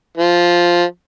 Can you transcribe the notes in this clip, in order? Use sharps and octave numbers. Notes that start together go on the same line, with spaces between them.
F3